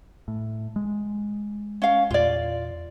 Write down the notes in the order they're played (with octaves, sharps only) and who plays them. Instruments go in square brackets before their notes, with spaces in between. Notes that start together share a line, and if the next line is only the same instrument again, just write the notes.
[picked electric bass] A2
G#3
[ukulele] C#4 F5
[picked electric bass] E2 A#2 [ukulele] F4 D5